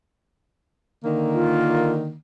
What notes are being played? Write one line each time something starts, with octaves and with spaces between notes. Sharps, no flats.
D3 D#3 A#3
F4